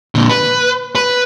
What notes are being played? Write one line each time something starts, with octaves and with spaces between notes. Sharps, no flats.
A#2 D3
B4
B4